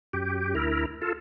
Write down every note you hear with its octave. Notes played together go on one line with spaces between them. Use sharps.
F#2 G4
D2 E4 A#4
F4 A4